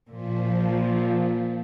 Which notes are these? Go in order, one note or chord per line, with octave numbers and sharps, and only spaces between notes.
A#2 F3